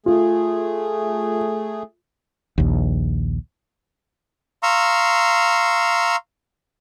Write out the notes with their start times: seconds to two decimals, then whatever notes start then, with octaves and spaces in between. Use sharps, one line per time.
0.06 A3 F4 G#4
2.58 A#1 D#2
4.63 F5 A#5 C6 C#6 E6